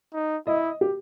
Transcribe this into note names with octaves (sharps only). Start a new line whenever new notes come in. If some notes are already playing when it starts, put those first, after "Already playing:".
D#4
E4 D#5
G4